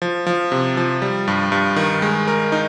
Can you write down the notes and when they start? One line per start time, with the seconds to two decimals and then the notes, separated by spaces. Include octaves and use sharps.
0.02 F3
0.27 F3
0.52 C3
0.77 F3
1.02 G3
1.28 G2
1.52 G2
1.76 D#3
2.02 G#3
2.28 A#4
2.52 D#4